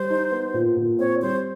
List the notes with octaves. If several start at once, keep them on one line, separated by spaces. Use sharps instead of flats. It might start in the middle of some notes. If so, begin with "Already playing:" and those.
Already playing: G3 C5
D#4
B3
A#2
A#2
C4 C#5
G3 C5